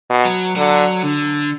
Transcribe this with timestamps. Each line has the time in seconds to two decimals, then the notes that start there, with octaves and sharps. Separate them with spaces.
0.10 B2
0.25 F#3
0.56 D3 F#3
1.03 D3